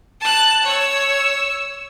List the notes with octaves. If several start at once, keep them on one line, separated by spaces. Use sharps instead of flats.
A5 F#6
C#5 E6